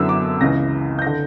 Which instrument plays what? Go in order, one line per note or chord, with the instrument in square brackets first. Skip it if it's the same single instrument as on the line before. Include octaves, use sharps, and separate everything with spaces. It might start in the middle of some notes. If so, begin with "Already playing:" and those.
Already playing: [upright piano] F#2 D3 F#3 B3 E4 E6
D6
C#2 C#3 E3 A#6
G6
D3 A#6